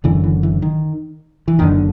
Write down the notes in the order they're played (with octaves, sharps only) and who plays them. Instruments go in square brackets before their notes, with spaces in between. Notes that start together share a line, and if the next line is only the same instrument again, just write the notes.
[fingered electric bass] F#1 F#2 D3 E3
E3
E3
D#3
E3
F#1 F#2 D3 D#3